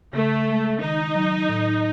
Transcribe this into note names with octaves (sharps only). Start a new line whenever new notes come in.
C#3 A3
G#3
D#3 D#4
F#3
A2